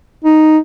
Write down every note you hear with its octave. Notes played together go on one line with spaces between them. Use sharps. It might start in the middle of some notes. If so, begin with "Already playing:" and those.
D#4